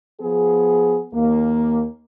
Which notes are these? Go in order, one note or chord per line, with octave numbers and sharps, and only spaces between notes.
F3 B3 G#4
D#2 A#3